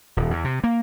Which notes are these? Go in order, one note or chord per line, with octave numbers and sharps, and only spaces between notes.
D#1
E2
C3
A#3